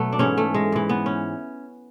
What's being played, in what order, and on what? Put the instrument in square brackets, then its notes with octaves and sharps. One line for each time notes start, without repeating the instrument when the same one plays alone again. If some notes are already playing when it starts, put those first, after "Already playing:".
Already playing: [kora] B2 F#3 A3 B3
D4
G#2 E3 C#4
A3
G#3
G#2 E3
B3
C#4